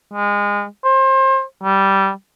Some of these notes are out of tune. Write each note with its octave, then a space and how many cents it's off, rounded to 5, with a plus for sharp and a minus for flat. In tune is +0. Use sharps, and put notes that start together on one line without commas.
G#3 -25
C5 +30
G3 -10